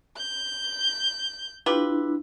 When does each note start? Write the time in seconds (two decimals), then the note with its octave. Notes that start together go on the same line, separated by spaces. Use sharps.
0.17 G6
1.66 D4 E4 F4 G4 B4